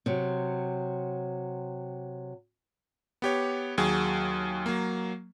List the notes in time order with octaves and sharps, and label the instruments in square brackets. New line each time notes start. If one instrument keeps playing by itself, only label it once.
[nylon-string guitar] C3 F#3
[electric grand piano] B3 G4 C#5
D#2 F#3 G#4
F#3 A#3